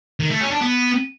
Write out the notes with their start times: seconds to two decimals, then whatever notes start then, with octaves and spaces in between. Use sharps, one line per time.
0.20 D#3
0.30 A3
0.40 C#4
0.51 D4
0.61 B3